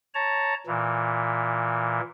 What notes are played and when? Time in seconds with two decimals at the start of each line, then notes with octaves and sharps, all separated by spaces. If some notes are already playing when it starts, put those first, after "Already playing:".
0.14 C#5 A5 A#5
0.67 A#2 E3